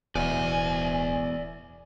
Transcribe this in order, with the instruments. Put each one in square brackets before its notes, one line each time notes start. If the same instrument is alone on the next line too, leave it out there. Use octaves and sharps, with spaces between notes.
[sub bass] D1 [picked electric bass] E2 B2 [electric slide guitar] D5 E5 [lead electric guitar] G#5